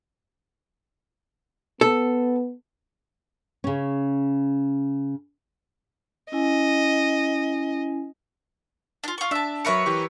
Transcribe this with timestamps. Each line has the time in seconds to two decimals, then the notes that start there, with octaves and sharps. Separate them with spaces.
1.81 B3 A4
3.64 C#3 C#4
6.32 C#4 E4 D#5 G#5
9.04 D4 F4
9.18 F4 C#6
9.31 D4 E5 A5 E6
9.65 F#3 A#4 B4 C#5 E5 C#7
9.86 E3 G4 C#6